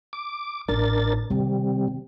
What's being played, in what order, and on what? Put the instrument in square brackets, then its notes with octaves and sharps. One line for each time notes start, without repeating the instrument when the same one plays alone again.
[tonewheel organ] D6
[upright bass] A1 D#4 [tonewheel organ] D4 A#4 A6
[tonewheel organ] C3 G3 [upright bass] D#3 C4